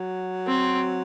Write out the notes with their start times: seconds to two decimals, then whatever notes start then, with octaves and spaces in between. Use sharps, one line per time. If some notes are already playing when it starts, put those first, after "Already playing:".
Already playing: F#3
0.47 C4